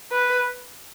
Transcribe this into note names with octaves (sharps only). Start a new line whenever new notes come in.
B4